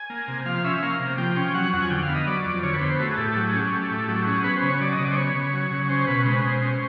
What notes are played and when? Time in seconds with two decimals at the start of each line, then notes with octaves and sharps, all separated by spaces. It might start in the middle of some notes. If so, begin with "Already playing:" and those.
Already playing: G#5
0.10 A#3
0.28 C3
0.46 F3 F5
0.64 C#4 E5
0.83 A#3 F5
0.99 C3
1.18 F3 G5
1.36 C#4 G5
1.54 F#3 F#5
1.73 F2 F#5
1.82 G#5
1.90 D3 G5
2.02 F5
2.09 B3
2.15 D#5
2.27 F#3 D5
2.45 F2
2.63 D3 C#5
2.74 B4
2.81 B3 C5
2.99 A3 F#4
3.10 G#4
3.18 A2 G4
3.35 F#3 G4
3.47 G#4
3.53 C#4
3.58 G4
3.72 A3
3.91 A2
4.09 F#3 G4
4.27 C#4 G#4
4.44 B3 B4
4.56 C5
4.62 C#3
4.69 C#5
4.80 F#3 D5
4.93 D#5
4.99 C#3
5.05 D5
5.11 C5
5.17 B3 C#5
5.35 C#3
5.53 F#3
5.71 C#3
5.89 C#4 C5
6.07 B2 B4
6.25 G#3 C5
6.33 B4
6.41 B2 C5
6.62 C#4